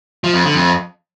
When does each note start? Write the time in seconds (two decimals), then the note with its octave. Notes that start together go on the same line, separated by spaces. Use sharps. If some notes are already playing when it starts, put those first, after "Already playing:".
0.24 F3
0.34 F2
0.44 D3
0.54 F2